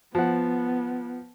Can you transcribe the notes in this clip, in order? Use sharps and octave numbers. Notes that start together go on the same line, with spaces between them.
F3 B3 F#5